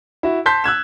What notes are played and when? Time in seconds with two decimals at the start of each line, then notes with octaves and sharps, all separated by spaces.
0.23 E4 F#4
0.46 A5 C6 G6 B6
0.64 E6 F#6 G#6 E7